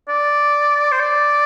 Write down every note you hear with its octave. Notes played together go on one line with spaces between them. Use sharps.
D5
C5
D5